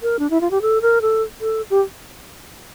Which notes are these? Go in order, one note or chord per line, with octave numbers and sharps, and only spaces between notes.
A#4
D4
E4
F4
G4
A4
A#4
A4
A4
G4